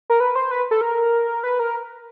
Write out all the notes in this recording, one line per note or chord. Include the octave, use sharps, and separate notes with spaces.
A#4
B4
C5
B4
A4
A#4
B4
A#4